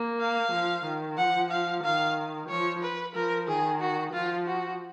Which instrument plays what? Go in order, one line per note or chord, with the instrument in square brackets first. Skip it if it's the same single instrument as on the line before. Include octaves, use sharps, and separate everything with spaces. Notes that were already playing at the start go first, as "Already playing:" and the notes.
Already playing: [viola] A#3
[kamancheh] F5
[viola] F3
D#3
[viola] F3 [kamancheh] F#5
[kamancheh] F5
[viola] D#3 [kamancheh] F5
[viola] F3 [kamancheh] C#5
[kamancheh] B4
[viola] F3 [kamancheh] A#4
[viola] D#3 [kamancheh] G#4
[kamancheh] F#4
[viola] F3 [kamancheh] F4
[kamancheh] F#4